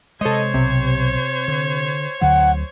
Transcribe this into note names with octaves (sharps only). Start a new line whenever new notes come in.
C3 G#3 A4 C5 C#5 D#5 G#6
B1 C3
D3
D2 D3 F#3 F#5